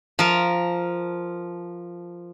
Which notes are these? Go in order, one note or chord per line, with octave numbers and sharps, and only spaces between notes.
F3 A#4